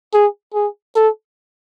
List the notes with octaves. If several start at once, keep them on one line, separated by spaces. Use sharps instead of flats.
G#4
G#4
A4